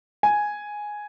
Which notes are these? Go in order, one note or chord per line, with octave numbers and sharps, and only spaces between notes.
G#5